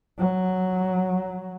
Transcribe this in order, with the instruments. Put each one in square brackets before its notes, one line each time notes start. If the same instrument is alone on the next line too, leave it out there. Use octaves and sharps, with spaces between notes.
[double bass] F#3